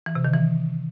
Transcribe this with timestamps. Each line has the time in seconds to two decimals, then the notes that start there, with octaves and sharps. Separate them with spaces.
0.06 E3
0.15 C3
0.25 D#3
0.34 E3